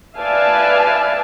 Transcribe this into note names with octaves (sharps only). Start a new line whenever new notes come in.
B4 D5 E5 F5 G#5 A5